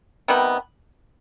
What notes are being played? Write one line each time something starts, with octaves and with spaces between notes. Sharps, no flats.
C3 D#3 G3 B3